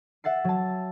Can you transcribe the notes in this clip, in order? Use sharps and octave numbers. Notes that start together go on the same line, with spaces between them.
E5 F#5 A6 C7
F#3 A5